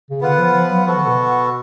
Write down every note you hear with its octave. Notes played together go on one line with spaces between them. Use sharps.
C#3
D3 B3 F4 B4 F#5
F3
F3
F#3
F3 B3 F#4 A4
D3
B2